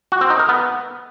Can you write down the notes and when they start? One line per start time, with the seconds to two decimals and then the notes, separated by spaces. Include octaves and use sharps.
0.12 F#4
0.21 C4
0.30 D#4
0.39 A#4
0.49 B3